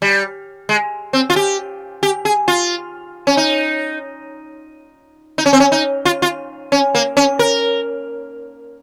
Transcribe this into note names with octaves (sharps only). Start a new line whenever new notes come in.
G3
G#3
C4
F4
G4
G4
G#4
F4
C#4
D#4
D#4
C#4
C4
C#4
D#4
F4
F4
C#4
A#3
C#4
A#4